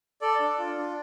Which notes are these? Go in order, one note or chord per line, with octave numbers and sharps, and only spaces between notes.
A4 D5
D4
F4
D4